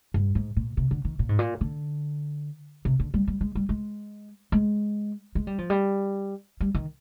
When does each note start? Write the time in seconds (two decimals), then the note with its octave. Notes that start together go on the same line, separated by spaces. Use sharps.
0.14 G2
0.35 G#2
0.56 A#2
0.77 C3
0.91 D3
1.05 D#3
1.19 A#2
1.29 G#2
1.39 A#2
1.61 D3
2.85 C3
2.99 D3
3.14 G3
3.27 G3
3.41 G#3
3.55 G3
3.69 G#3
4.52 G#3
5.35 G#3
5.47 G3
5.58 F3
5.70 G3
6.60 G3
6.75 D#3